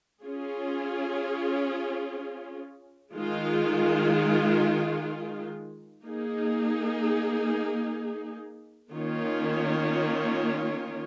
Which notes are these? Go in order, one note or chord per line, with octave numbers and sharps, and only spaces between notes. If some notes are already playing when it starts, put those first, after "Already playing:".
C#4 F4 G#4
D#3 G#3 F4
A#3 D#4 G#4
D#3 A#3 C#4 F4 C#5